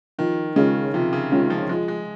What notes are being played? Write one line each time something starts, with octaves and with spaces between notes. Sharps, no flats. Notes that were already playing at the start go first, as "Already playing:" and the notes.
D#3 F3
C#3 G#3 C#4 F4
C3 F3
C#3
D#3 G#3 C#4 F4
F3
F3 G#3
G#3